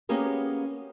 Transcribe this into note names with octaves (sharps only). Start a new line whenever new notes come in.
A#3 B3 C#4 G4 G#4 A#4